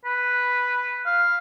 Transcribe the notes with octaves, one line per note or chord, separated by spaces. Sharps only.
B4
F5